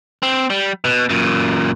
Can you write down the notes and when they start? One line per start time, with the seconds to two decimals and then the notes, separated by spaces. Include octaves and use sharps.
0.23 C4
0.50 G3
0.85 B2
1.10 F#2 A#2